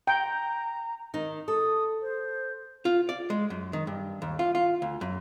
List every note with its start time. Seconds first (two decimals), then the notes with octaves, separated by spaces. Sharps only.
0.07 G5 A#5
1.14 D#3 D#4
1.48 A4 D#6
2.02 C5
2.85 F4
3.09 D5
3.30 G#3
3.50 F#2
3.73 D#3
3.87 G2
4.22 D#2
4.39 F4
4.55 F4
4.82 D2
5.01 F#2